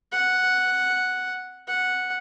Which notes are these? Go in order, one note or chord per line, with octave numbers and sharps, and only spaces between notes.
F#5
F#5